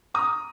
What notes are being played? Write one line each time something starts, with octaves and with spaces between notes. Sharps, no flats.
A#5 D#6